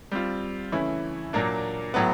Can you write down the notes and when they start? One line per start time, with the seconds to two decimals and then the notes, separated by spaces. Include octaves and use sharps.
0.12 G3 C4 F4
0.72 C#3 E3 A3 C#4 E4
1.33 A#2 F#3 A#3 D4
1.94 A2 F#3 B3